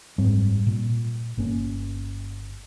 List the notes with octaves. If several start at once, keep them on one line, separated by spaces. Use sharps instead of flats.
F#1 G#2 G3 C4
A#2
G1 A#3 C#4